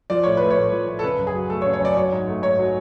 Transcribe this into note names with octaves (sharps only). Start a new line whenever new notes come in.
F3 D5
A2 C#5
A3 B4
C#5
A2
F3
A2
A4
C#3 B4
F#2
G#4
F#3
A3 A4
C#5
C#3
C#5
F#2 D5
F#3 C#5
G#2
A3
G#2 C#5
F#3